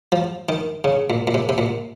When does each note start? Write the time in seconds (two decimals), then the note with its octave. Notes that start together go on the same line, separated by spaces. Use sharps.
0.12 F3
0.49 D#3
0.84 C#3
1.10 A#2
1.27 A#2
1.34 C3
1.49 C3
1.58 A#2